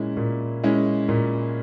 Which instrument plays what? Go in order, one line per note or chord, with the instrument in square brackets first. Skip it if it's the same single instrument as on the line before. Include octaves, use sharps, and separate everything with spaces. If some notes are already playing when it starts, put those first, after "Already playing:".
Already playing: [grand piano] A#2 G#3 C#4 E4
A#2
G#3 C#4 E4
A#2